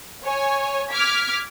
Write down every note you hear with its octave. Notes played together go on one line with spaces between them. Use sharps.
C#5 G#5
D6 F6 G#6 B6